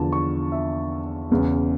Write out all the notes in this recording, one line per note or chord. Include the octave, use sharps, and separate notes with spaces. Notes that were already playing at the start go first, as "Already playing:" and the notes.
Already playing: E2 D3 F3 A5
C#6
E5
E1 E2 C#3